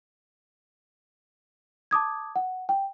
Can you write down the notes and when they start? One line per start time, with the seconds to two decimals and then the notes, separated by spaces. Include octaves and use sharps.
1.91 A5 D6 D#6 G#6
2.36 F#5
2.69 G5